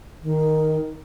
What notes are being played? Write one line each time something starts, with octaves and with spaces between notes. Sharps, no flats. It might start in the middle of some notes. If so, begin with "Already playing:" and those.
D#3